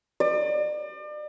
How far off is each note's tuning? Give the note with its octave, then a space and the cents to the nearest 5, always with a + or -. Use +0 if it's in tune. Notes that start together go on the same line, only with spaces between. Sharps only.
D5 +35